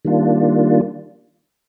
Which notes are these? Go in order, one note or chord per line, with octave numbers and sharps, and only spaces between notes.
D#3 G3 A#3 D4 F4